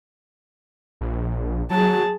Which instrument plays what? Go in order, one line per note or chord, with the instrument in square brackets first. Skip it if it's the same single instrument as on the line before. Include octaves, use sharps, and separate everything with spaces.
[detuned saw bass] A#1
[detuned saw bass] F#3 [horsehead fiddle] G#4 A5